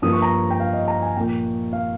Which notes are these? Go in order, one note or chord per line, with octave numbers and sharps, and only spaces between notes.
G2 F3 A#3 D#6
C#6
A#5
G5
F5
D#5
A#5
G#5
A#2 F3 A#3 G5
F5